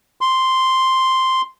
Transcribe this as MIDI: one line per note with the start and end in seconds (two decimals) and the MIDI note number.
0.21 1.42 84